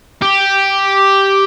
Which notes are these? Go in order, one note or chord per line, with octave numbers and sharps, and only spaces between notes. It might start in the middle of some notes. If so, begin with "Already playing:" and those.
G4